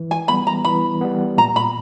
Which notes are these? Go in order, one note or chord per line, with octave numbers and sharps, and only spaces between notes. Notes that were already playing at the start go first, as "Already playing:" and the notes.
Already playing: E3
G#5
G3 B3 B5
A#5
E3 B5
G3 B3
A#2 A#5
B5